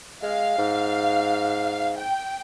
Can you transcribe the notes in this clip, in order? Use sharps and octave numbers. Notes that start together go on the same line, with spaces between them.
G#3 F5
G#2
G5